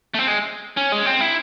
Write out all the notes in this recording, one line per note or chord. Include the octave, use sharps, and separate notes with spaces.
A3
C4
G#3
C#4
G#3
C4
E4